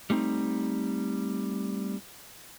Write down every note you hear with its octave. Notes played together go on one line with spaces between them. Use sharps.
G3 A3 C4 D#4